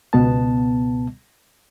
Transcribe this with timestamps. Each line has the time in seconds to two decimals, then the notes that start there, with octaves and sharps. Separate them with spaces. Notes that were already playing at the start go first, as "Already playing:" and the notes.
0.13 C#2 B2 B3 A5